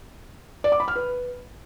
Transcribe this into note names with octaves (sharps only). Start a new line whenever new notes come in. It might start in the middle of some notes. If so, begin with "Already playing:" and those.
D5
D6
B5
F6
B4